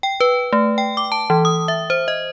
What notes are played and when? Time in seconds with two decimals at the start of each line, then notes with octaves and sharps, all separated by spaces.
0.03 G5
0.20 B4
0.53 A3
0.78 G5
0.97 D6
1.12 A5
1.30 E3
1.45 D#6
1.68 E5
1.90 C5
2.08 D#5